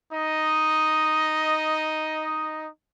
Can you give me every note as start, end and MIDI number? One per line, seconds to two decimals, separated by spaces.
0.12 2.67 63
0.12 2.67 75